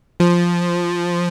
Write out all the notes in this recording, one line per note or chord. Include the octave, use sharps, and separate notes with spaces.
F3